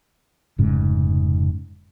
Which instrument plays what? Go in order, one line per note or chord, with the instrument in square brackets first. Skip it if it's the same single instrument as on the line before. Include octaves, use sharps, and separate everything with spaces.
[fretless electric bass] F1 G#2 C#3